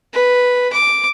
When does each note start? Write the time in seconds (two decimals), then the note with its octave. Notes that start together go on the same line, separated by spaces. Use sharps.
0.14 B4
0.73 D6